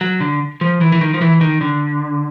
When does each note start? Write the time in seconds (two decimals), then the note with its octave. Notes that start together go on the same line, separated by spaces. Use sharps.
0.01 F#3
0.20 D3
0.61 F3
0.81 E3
0.92 E3
1.01 D#3
1.14 F3
1.21 E3
1.41 D#3
1.61 D3